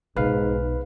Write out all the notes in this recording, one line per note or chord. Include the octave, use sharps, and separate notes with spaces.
B1 G#2 B4 F5